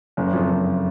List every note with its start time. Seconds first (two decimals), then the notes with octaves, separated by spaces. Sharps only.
0.17 F#1
0.33 F2
0.50 F#1